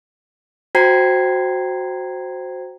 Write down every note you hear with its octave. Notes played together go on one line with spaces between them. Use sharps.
F#4 C5 G5 A#5 G#6 C7